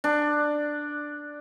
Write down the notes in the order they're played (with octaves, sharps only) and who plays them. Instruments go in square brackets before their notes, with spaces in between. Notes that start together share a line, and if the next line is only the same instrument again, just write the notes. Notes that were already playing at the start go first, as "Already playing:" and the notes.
[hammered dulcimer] D4